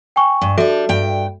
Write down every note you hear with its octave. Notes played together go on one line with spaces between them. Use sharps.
G5 G#5 C#6
G2
G3 D4 F#4 A4 E5
G2 G5